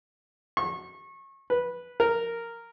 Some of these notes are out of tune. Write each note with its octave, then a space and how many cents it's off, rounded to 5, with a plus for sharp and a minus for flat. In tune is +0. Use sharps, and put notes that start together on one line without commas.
C#6 -30
B4 -10
A#4 -10